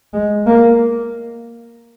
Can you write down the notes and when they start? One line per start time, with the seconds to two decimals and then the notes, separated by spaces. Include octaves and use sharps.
0.14 G#3
0.47 A#3